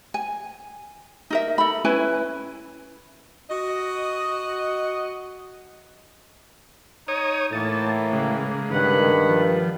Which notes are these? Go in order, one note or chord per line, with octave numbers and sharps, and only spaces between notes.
G#5
D#4 A#4 E5
A4 B5
C#4 E4 B4 G#5
F#4 D#5
D#4 C#5 D#6
A2 E3 A#3 A5
C#3 G#3
G2 D#3 F#5 B5
F3